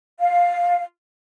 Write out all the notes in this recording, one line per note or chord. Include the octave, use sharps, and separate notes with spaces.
F5